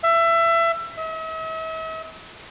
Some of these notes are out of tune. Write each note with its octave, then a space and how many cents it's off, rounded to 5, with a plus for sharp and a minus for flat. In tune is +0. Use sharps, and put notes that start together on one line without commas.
E5 +25
E5 -45